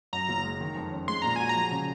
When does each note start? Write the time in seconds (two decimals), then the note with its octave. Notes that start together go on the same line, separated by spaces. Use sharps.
0.13 F#2 A#5
0.29 F#1
0.45 G#3
0.61 D#3
0.76 F2
0.92 C#4
1.08 G#3 C6
1.22 A#2 A#5
1.36 F#4 G#5
1.49 A#5
1.56 F3
1.71 C#3